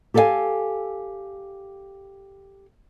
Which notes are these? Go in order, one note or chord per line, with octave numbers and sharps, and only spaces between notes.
G4 A4 D5 E5 F5 G#5